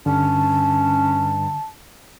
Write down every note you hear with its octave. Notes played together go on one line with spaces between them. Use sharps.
G2 D3 C#4 A5